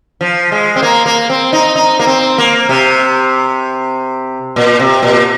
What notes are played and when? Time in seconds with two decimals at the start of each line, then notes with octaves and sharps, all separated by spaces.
0.21 F3
0.52 G#3
0.76 C4
0.83 A#3
1.06 A#3
1.30 C4
1.53 D#4
1.75 D#4
2.00 A#3
2.07 C4
2.38 A#3
2.69 C3
4.56 A#2
4.80 C3
5.02 A#2